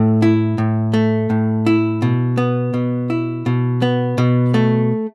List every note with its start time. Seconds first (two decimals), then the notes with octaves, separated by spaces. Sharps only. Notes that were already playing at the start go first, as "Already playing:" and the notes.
Already playing: A2 A3
0.22 E4
0.58 A2
0.94 A3
1.30 A2
1.66 E4
2.02 B2
2.37 B3
2.74 B2
3.10 E4
3.46 B2
3.82 B3
4.18 B2
4.54 A3